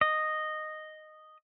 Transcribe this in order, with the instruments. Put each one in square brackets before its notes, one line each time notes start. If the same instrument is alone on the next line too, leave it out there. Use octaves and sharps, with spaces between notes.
[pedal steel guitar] D#5